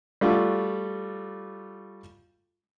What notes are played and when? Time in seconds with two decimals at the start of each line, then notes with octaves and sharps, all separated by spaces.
0.21 G3 A3 F4 F#4